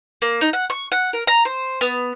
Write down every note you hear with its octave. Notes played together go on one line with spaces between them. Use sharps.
A#3
D#4
F#5
C#6
F#5
A#4
A#5
C5
B3